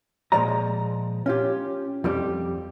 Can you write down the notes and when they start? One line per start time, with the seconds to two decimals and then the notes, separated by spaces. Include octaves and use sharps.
0.32 A#2 F3 G#3 D5 D#5 A#5
1.26 C#4 F4 G4
2.04 F2 G3 G4